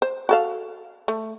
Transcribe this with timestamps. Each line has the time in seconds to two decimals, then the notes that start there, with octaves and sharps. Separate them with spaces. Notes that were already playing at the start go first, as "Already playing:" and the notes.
0.02 C5
0.29 F#4 A4 F5
1.08 A3